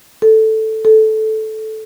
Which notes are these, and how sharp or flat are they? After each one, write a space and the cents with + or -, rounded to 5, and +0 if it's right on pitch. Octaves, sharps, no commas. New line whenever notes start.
A4 +0
A4 -10